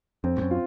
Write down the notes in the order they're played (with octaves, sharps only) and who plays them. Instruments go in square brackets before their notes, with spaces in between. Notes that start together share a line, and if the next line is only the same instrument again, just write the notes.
[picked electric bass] F2 [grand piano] C4
[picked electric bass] G#2
F#2
[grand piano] F4